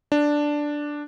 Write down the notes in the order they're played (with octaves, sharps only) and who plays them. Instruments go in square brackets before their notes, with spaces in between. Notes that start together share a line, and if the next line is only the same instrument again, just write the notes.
[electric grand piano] D4